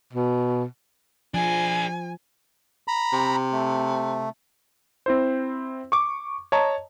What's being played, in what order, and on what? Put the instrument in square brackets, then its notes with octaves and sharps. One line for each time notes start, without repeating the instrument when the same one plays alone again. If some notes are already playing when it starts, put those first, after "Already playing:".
[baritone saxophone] B2
[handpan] F3 [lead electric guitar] D4 G#4 [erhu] G#5
[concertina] A#5 B5
[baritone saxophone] C3
[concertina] A3
[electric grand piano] C4 E4 C5
C#6 D6
C#5 D#5 A5 A#5